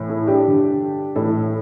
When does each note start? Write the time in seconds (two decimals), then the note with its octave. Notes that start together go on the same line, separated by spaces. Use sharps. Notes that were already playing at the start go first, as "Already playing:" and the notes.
Already playing: A2 E3
0.09 E4 A4
0.27 D4 G4
0.45 G2 D3
1.16 A2 E3 E4 A4